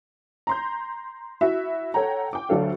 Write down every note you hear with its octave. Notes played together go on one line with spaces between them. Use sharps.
A#5 C6 G6
E4 F#4 E5
A4 C#5 F#5 G5 A#5
G5 D6
D2 F#3 D4 A4 F5